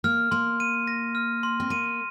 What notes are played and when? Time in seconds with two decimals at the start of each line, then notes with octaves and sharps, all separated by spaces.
0.04 A#3 F6
0.31 A#3 C6
0.60 D#7
0.87 A#6
1.15 F6
1.43 C6
1.60 C4
1.70 A#3 D#7